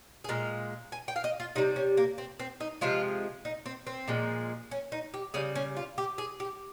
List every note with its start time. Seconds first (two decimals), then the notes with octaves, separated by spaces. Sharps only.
0.24 G#4
0.29 A#2 G#3 A#4
0.92 G#5
1.08 G5
1.16 F5
1.24 D#5
1.40 F4
1.55 C3 G3 D#4
1.76 C#4
1.97 A#3
2.18 C4
2.39 C4
2.60 D#4
2.81 C3 F3 G#3 F4
3.45 D#4
3.66 C4
3.87 C4
4.08 A#2 F3 G#3
4.71 C#4
4.92 D#4
5.14 G4
5.34 C#3 G3 G#4
5.55 C#4
5.76 F4
5.98 G4
6.18 G#4
6.40 G4